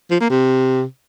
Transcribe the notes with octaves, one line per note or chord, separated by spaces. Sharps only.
F3
A#3
C3